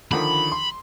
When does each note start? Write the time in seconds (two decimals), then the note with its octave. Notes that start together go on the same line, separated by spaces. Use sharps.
0.12 D3 D#3 F3 B5
0.52 C6